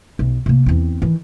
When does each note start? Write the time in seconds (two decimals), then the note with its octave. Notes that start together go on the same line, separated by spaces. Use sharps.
0.19 B1
0.46 C3 A#3
0.66 E2 C4
1.02 D#3 E3